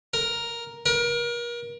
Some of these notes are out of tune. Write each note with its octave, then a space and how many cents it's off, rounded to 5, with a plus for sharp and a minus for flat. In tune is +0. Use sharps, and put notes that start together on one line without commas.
A#4 +5
A#4 +35